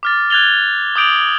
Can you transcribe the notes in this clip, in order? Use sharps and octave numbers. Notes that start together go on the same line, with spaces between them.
D6 F6 A6
F#6 G#6 A6 F7 G7
D6 D#6 G6 D7 F7 F#7